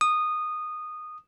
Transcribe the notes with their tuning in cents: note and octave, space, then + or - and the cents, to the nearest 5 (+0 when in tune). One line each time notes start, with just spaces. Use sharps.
D#6 -15